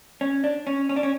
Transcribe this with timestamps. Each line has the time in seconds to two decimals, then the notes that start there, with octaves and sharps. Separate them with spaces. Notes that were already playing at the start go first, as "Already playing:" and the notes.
0.21 C#4
0.44 D4
0.67 C#4
0.89 C#4
0.96 D4
1.03 C#4